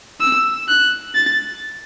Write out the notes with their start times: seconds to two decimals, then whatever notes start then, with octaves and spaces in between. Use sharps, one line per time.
0.21 E6
0.68 F#6
1.15 A6